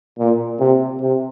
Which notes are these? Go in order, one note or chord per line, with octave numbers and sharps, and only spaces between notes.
A#2
C3
C3